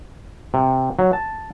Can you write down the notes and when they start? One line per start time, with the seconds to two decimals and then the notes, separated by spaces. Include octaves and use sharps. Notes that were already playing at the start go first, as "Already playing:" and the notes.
0.54 C3
0.99 F#3
1.13 A5